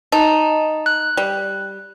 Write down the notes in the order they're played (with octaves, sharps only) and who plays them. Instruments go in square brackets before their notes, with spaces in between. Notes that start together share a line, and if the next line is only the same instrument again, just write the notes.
[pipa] D#4 [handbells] A5
[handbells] F#6
[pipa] G3